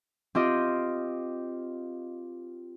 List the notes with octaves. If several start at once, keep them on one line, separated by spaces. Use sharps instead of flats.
C4 F4 G4 D#5